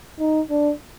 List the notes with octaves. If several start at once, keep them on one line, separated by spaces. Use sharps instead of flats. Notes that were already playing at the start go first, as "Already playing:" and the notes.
D#4
D4